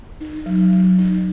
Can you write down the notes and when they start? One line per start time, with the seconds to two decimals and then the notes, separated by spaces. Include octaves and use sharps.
0.21 D#4
0.46 F#3
0.72 F#3
0.98 D#4